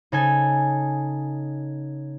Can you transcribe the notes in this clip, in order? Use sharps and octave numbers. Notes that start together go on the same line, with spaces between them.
C#3 D#4 A4 G#5